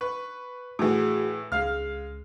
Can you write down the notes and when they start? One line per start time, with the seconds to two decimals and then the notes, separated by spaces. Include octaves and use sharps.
0.01 B4 C#6
0.79 A2 E3 F#4 G#4 F#5
1.52 C#2 G#3 F5 F6